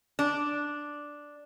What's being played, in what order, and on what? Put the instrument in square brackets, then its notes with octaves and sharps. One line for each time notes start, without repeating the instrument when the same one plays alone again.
[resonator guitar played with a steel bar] D4